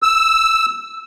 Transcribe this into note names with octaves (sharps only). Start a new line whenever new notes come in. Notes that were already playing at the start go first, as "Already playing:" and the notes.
E6